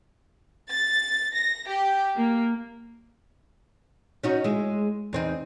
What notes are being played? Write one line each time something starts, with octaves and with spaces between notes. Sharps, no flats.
A6
A#6
G4
A#3
C#4 D#4 F#4
G#3 E4
E2 C4 D#4